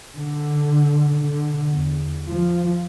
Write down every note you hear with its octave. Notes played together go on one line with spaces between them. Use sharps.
D3
D3
E2
F3